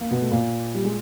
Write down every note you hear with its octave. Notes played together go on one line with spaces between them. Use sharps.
A#3
B2 B3
A3
A#2 A#3
G3
G#3